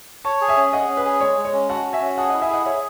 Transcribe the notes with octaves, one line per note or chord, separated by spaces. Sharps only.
C#5 A5 C#6
G#4
E5 G#5
C#4
G#4 D#5 F#5
C#4
B4
G#4
G#3 C#5
G#3
C#5
C#4
F#4 F#5 A5
F#4
E5 G#5
C#4
G#4 F#5 A5
D#5 F#5
E4
E5 G#5
G#4 D#5 F#5
G#4 C#5 E5